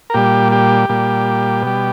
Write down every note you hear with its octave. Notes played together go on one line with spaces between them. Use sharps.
A#4
A#2 G3 G4
G4
A#2 G3
B2 G3